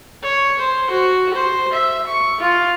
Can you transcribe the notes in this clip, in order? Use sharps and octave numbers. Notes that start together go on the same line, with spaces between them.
C#5
C5
F#4
C5
E5
C#6
F4